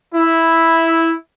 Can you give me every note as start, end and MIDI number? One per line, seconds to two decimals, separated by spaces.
0.13 1.14 64